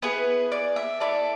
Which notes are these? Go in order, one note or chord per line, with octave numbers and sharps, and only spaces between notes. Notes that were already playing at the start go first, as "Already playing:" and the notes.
B3 E4 G#4 B4
D5
E5
B3 E4 A4 D5